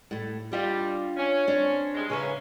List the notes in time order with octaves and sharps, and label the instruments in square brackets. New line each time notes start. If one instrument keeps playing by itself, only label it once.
[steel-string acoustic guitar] A2 A3
[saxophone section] G3 [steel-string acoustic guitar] D4 F4 D#5
[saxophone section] C#4
[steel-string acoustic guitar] C4 D4
[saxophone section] G2 G#3
[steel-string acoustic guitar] C#3 B4 E5 [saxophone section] A#3 C#4